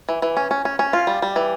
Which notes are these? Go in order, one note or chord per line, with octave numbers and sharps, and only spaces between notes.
E3
E3
C#4
C#4
C#4
C#4
F4
G3
G3
E3